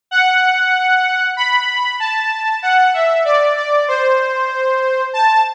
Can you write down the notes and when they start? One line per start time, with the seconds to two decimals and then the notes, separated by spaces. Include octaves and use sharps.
0.11 F#5
1.37 B5
2.00 A5
2.63 F#5
2.94 E5
3.25 D5
3.57 D5
3.88 C5
5.13 A5